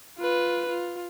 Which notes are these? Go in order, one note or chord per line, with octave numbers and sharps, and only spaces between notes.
F4 B4
F4